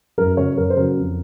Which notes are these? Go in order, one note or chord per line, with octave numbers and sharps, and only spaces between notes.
F#2 A#4
C#3 F#3 C#5
F#2 A#4
C5
C#3 F#3 A#4
F2